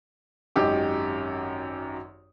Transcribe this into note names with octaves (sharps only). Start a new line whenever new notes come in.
G#1 F#2 D#4 G4 D6